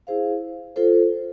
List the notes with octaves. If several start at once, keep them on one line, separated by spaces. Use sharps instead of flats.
E4 G#4 C5 F5
F4 A4 C5